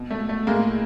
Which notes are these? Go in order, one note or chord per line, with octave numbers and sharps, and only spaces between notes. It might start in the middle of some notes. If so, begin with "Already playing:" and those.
Already playing: B2
A3
A3
A2 G#3 A#3